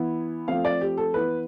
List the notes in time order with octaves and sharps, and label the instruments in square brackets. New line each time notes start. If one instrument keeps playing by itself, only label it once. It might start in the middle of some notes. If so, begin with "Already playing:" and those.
Already playing: [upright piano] E3 B3 E4
F3 A3 C4 F5
D5
G4
A4
E3 B3 E4 B4